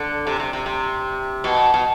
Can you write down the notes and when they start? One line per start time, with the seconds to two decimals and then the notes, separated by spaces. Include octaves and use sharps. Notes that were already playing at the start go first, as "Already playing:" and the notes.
Already playing: D3
0.27 C3
0.40 C3
0.53 C3
0.66 C3
1.44 B2
1.74 B2